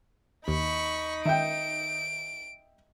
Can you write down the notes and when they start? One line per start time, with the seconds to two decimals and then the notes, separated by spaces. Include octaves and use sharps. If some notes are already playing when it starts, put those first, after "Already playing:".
0.48 D#2 D#4 B5 C#6
1.25 D#3 E5 G5 D7